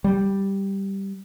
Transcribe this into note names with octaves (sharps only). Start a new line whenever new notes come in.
G3